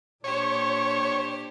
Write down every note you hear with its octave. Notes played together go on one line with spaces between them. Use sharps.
A#2 D4 G4 C5 C#5